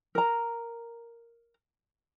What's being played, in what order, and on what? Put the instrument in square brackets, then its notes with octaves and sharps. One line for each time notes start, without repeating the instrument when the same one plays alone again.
[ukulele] A#4 A#5